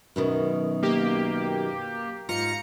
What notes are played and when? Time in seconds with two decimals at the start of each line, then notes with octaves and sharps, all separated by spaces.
0.16 F#2 B2 D#3
0.83 A#3 G4
2.29 G#2 F4 F5 A#5 C#7